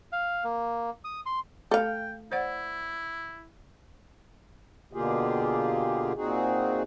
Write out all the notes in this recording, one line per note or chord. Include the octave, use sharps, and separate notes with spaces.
F5
A#3
D#6
C6
A3 A4 F5 G5
E4 C5 D5 F#5
B2 D3 A#3 F4 G4 G#4
A#2 C4 D#4 F#4 G#4